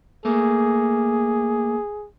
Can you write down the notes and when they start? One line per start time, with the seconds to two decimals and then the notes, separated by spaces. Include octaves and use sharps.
0.25 A3 A#3 G#4